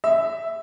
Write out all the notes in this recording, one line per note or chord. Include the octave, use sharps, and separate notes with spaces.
E5